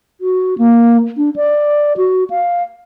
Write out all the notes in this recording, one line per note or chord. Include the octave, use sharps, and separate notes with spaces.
F#4
A#3
D4
D5
F#4
F5